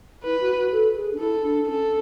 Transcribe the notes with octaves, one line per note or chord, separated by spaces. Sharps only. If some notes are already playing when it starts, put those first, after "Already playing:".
E4 B4
F#4
F#4
A4
G#4
D4
E4 A4
D4
C#4 A4